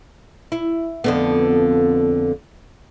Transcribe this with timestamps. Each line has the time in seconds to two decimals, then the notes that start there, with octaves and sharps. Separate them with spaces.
0.52 E4
1.04 F2 D3 B3